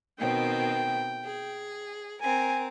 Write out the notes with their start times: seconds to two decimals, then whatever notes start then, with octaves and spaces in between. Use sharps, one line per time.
0.20 B2 D#3 C4 G5
1.24 G#4
2.21 C4 A#4 G#5